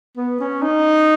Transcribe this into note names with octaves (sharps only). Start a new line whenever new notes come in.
B3
C#4
D#4